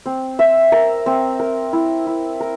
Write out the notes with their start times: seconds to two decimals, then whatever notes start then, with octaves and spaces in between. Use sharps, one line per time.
0.06 C4
0.39 E5
0.72 A#4
1.06 C4
1.40 A#4
1.73 E4
2.06 E4
2.40 A#4